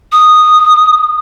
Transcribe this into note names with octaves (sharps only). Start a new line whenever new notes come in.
D#6